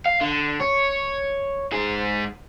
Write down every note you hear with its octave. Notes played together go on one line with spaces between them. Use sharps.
F5
D3
C#5
G#2 G#4